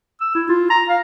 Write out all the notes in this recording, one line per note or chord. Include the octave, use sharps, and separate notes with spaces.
E6
E4
F4
A#5
F5